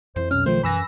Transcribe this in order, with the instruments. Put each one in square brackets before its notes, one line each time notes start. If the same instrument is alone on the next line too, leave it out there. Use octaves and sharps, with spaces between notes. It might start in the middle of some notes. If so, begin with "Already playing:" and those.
[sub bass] F2 [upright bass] E3 [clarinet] C5
[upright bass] B1 [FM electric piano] C#4 [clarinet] F6
[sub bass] D#3 [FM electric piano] F3 A3 [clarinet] C5
[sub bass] F#2 [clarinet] E3 [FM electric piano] B5 E6 A#6